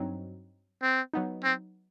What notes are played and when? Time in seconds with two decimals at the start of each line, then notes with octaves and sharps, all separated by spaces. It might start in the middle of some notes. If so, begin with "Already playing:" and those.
Already playing: G2 F#3 C4 D#4
0.82 C4
1.13 F#3 B3 D#4
1.44 C4